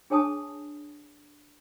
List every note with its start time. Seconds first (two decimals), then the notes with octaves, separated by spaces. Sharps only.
0.10 D4 G#4 C#5 G#5 A5 D#6